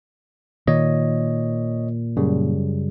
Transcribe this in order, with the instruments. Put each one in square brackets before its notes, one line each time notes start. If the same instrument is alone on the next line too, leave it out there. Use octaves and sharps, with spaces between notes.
[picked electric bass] A#2 [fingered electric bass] D#3 [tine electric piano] C#5 D#5
[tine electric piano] F#2 C#3 G3